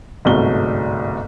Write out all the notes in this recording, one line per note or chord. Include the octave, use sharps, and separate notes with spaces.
G1 C2 G#2 F#3 A3 G7